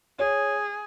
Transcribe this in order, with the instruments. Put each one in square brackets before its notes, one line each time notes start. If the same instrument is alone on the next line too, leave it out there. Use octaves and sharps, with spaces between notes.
[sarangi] G#4 [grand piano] C#5